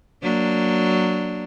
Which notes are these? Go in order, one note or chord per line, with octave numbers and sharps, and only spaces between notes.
F#3 A#3 D4